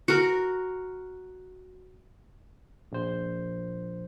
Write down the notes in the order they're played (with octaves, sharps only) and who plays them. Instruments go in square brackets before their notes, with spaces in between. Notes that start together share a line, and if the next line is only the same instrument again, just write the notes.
[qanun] F#4 A#4
[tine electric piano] A#1 C5